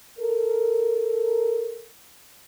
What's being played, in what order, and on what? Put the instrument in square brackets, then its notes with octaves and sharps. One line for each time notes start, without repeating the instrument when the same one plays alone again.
[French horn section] A4 A#4